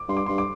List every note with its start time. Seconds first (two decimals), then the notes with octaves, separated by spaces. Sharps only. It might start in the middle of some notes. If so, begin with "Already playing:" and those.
Already playing: D6
0.09 G2 C6
0.17 D6
0.26 G2 C6
0.38 D6